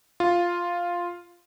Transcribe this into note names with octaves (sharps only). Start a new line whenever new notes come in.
F4